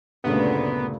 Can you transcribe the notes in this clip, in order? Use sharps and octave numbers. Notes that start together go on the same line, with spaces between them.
D2 G2 A#2 C#3 A3 B3